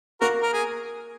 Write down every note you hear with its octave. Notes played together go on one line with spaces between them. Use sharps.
A#3 F#4 A#4
A#4
G#4